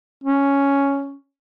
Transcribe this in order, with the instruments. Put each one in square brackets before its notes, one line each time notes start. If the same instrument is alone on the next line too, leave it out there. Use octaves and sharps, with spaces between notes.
[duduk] C#4